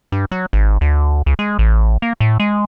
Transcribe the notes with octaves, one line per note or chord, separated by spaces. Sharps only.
G2
F#3
G#1
D2
C#2
G#3
A1
A#3
A2
G#3